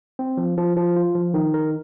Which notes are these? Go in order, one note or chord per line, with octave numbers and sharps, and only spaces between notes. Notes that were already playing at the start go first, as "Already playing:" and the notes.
C4
F3
F3
F3
F4
F3
D#3
A#4